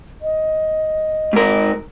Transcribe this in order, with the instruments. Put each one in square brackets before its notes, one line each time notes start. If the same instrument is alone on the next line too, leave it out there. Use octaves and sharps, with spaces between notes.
[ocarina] D#5
[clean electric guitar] G#2 A#4